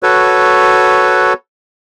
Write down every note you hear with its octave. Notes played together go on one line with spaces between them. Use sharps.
F#4 A4 B4 C#5